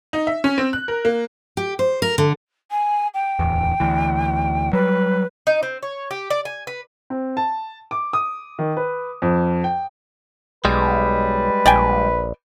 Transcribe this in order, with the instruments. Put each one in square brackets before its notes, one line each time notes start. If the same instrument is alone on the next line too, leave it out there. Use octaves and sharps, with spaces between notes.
[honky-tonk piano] D#4
E5
C#4
C4
F#6
A#4
A#3
[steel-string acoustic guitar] G4
C5
A#4
D3
[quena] G#5
G5
[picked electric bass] D1 E2
D2 E3
[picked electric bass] F#3 G3 [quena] B4
[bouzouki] D#4
C4
C#5
G4
D5
G#5
B4
[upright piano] C4
A5
D6
D#6
D#3
B4
F2
G5
[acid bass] B1 [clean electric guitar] G3 G#3 [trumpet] B4
[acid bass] A#1 [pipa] D5 G5 G#5